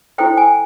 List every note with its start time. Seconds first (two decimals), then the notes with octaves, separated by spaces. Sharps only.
0.18 E4 A4 C5 G5
0.37 G#5